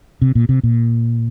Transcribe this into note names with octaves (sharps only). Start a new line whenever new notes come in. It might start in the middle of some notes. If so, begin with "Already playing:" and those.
C3
A#2
C3
A#2